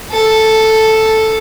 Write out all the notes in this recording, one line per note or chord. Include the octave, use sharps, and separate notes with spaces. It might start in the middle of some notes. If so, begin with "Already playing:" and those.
A4